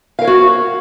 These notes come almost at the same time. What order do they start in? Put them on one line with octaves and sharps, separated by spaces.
F5 A#4 C#5 F#4